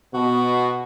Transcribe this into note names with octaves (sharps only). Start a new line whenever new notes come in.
B2 F#4